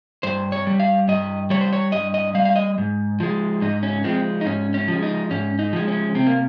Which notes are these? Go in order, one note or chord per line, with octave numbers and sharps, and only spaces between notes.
G2 C5
C#5
G3
F5
G2 D#5
G3 C#5
C5
C#5
G2 D#5
D#5
G3 F5
F5
D#5
G#2
F3 G#3
G#2 D#4
C#4
F3 G#3 C4
D#4
G#2 C#4
C#4
F3
G#3
D#4
G#2 C#4
D#4
F3 G#3
C#4
C3 C4
A#3